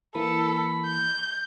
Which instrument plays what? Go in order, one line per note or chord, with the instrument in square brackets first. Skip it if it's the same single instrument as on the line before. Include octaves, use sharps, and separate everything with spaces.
[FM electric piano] E3 A#3 [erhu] A4 [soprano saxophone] B5
[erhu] G6